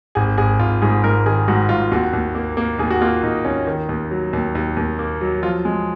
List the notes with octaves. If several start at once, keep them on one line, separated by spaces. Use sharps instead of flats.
G#1 G#4
G#1 G#4
G#1 F4
G#2 G#4
G#2 A#4
D#3 G#4
G#2 F#4
G#2 F4
D#2 F#4
D#2
A#3
A#3
D#2 G#4
F#4
A#3 F4
D#2 D#4
D#2 C#4
D#3
D#2
F#3
D#2
D#2
D#2
A#3
F#3
F3 F4
G#3